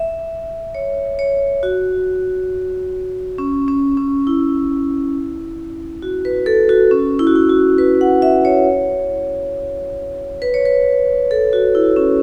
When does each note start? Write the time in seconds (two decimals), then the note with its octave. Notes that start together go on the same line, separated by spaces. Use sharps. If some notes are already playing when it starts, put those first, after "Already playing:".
Already playing: E5
0.75 C#5
1.19 C#5
1.63 F#4
3.38 C#4
3.68 C#4
3.97 C#4
4.27 E4
6.02 F#4
6.25 B4
6.46 A4
6.69 F#4
6.91 C#4
7.19 E4
7.27 F#4
7.36 E4
7.49 F#4
7.78 B4
8.01 F#5
8.22 E5
8.45 C#5
10.42 B4
10.54 C#5
10.65 B4
11.31 A4
11.53 F#4
11.75 E4
11.96 C#4